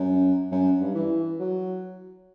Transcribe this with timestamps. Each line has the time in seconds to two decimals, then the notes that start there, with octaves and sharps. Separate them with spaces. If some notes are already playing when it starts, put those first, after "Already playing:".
Already playing: F#2
0.52 F#2
0.81 G2
0.95 E3
1.40 F#3